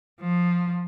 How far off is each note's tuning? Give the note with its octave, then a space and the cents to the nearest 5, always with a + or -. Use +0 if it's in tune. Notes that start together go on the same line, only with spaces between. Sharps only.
F3 +10